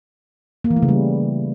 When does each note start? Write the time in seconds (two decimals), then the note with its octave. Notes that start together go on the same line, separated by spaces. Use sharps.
0.64 A#3
0.70 E3
0.76 A3
0.82 C#3
0.88 G3